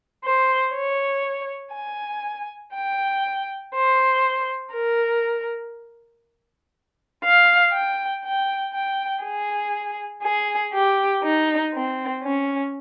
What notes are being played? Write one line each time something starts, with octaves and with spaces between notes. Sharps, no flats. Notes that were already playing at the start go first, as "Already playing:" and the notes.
C5
C#5
G#5
G5
C5
A#4
F5
G5
G5
G5
G#4
G#4
G4
D#4
C4
C#4